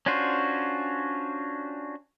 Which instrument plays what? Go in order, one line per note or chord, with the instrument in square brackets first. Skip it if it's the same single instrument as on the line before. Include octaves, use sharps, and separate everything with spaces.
[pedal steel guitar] C#4 D4 F4 F#4 C5